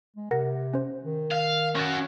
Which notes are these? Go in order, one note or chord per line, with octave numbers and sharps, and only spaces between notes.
G#3
C3 A#4 F#5 A#6
C#4 C5
D#3
F5
C#4 F#4 G6 A6